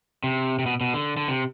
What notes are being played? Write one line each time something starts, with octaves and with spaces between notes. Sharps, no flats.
C3
C3
B2
B2
D3
D3
C3